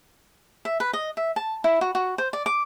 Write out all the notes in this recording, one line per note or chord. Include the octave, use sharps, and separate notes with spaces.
E5
B4
D#5
E5
A5
E4
F#4
F#4
C5
D5
D6